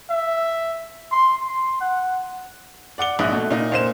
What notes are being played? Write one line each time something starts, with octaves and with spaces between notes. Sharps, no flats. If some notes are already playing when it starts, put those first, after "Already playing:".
E5
C6
C6
F#5
D5 F#5 D6 G7
A#1 G#2 D#4 E5 D#6 F#6
B2 A3
A#2 D#4
A#2 C5 E7